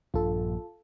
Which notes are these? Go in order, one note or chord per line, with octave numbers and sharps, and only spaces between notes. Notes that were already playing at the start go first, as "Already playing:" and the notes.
A#1 G2 A#2 F4 A4